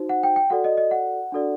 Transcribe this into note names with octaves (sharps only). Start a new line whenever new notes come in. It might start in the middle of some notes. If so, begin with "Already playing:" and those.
Already playing: D#4 F#4 C5
F#5
G5
G5
F#4 A4 D5 F#5
D#5
D#5
F#5
D4 F#4 A4 D5